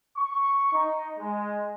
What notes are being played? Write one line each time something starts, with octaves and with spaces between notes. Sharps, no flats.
C#6
D#4
G#3